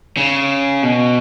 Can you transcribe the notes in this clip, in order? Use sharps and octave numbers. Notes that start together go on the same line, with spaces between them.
C#3
B2